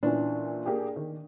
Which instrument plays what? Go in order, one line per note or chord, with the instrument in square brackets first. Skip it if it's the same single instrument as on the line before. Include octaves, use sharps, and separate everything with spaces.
[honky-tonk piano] A#2 E3 C#4 [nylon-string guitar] D4
[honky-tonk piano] A#3 G4 G#4
D#3